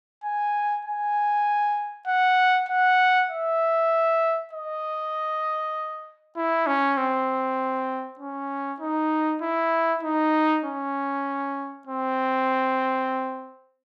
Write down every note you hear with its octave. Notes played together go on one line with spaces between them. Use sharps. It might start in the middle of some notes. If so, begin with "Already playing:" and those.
G#5
G#5
F#5
F#5
E5
D#5
E4
C#4
C4
C#4
D#4
E4
D#4
C#4
C4